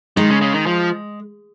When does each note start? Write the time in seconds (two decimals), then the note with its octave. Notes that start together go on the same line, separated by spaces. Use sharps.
0.17 D#3 G#3
0.30 C#3
0.41 C#3
0.53 D#3
0.66 F3